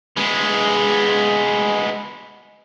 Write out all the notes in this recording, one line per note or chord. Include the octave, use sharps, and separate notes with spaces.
G#3 B3